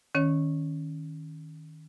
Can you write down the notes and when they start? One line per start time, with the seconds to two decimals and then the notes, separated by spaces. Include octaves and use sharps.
0.15 D#3 C#4 C#5